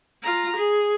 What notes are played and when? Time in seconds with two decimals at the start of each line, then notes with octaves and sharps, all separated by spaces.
0.22 F4 A#5
0.56 G#4